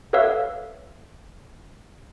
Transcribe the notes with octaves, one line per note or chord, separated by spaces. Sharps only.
A4 B4 C#5 E5 F5 E6